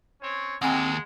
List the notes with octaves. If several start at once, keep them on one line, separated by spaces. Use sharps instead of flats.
C4 C#4 C#5
D#2 G#3 C4 F#5 G#5 A#5